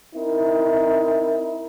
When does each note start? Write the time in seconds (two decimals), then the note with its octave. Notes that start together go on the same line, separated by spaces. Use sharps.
0.14 C4 D#4 E4 A#4